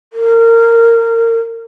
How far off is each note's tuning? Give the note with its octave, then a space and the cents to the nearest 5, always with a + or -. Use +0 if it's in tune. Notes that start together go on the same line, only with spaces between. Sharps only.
A#4 -25